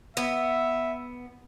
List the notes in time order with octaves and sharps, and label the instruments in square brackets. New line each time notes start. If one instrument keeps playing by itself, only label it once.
[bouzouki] B3 [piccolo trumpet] E5